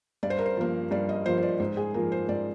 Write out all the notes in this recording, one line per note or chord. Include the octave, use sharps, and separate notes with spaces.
G2 D5
C5
A#4
C5
F3 A#3
G2 D5
D#5
F3 A#3 C5
C5
D5
G#2 C5
G#4
F3 A#3 A#4
C5
G#2 D5